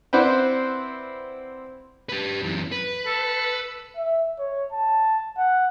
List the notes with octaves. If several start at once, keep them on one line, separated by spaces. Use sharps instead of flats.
C4 E4 B4 C5 D5 F#5
G4 B4
F#2 E3
B4
A4
E5
C#5
A5
F#5